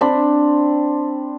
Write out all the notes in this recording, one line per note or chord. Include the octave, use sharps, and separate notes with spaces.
C4 D4 B5